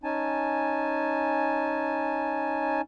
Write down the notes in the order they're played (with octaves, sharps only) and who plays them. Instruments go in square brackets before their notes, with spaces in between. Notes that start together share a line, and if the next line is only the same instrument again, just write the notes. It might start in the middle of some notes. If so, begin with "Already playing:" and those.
[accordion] C#4 D#4 G#5 A5